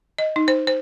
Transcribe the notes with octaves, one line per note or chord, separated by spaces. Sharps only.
D#5
D#4
C5
C5